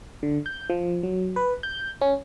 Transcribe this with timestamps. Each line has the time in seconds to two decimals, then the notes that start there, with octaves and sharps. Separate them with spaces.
0.23 D3
0.46 G6
0.70 F3
1.03 F#3
1.36 B4
1.63 G6
2.01 C#4